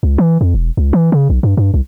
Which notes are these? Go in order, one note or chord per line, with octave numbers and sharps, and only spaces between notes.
C#2
E3
F2
E1
C#2
E3
C#3
B1
G2
G2
C2